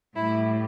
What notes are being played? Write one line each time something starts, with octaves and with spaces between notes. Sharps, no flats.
A2 G3 E4